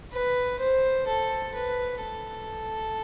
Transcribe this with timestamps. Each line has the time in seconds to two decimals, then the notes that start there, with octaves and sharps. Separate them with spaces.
0.13 B4
0.59 C5
1.07 A4
1.55 B4
2.02 A4